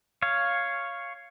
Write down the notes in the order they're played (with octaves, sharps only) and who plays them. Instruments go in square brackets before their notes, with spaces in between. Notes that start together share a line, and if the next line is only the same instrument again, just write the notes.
[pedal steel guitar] C#5 F5